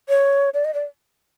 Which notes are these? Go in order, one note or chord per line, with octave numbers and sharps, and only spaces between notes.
C#5
D5
D#5
D5